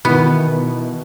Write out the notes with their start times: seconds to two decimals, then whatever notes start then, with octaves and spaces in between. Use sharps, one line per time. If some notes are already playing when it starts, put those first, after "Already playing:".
0.05 B2 D#3 E3 B3